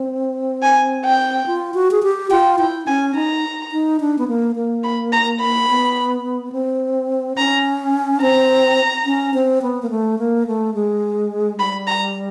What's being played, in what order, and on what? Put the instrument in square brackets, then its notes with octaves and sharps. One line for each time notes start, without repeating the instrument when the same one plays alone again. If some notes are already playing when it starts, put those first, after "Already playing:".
Already playing: [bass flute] C4
[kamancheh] G#5
G5
[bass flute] F4
F#4
G#4
G4
[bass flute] F4 [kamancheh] G5
[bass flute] E4 [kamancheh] G5
[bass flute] C#4 [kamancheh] G#5
[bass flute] D#4 [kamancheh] A#5
[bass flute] D#4
D4
B3
A#3
A#3
[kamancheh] B5
A#5
B5
[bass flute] B3
C4
[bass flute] C#4 [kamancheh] A#5
[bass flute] C4 [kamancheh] A#5
[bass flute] C#4
C4
B3
A#3
A3
A#3
A3
G#3
[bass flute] G3 [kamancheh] B5
[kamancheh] A#5